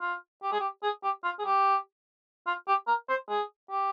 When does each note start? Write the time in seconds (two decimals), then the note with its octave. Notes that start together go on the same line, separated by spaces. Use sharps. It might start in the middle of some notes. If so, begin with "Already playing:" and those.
0.01 F4
0.43 G4
0.52 G#4
0.60 G4
0.83 G#4
1.04 G4
1.24 F4
1.39 G#4
1.45 G4
2.47 F4
2.68 G4
2.88 A#4
3.09 C5
3.29 G#4
3.70 G4